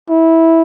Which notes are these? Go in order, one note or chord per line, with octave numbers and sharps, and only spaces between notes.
E4